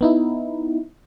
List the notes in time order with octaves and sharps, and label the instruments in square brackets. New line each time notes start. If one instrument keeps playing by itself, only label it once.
[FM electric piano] B3 D#4 E4